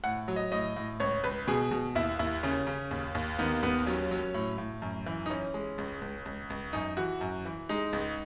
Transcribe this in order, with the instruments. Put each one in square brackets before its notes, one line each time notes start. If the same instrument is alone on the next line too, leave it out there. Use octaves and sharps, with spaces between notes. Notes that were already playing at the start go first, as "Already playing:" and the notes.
[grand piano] A2 F#5
F#3
D#5
A2 D#5
A2
C#2 C#5
C#2 B4
B2 G#4
B2
D#2 E4
D#2 E4
C#3 C#4
C#3
D#2
D#2
D#3 B3
D#2 B3
F#3 C#4
F#3
A2
A2
F#2
E3
D#4
E3 C#4
G#3
C#2
C#2
C#2
C#2
F#2 D#4
E3 F#4
F#2
E3
G#3 D#4
C#2